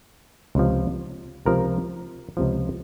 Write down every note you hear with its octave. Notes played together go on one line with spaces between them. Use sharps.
C#2 C3 F3
C#2 C3 F3 A#4
C#2 C3 F3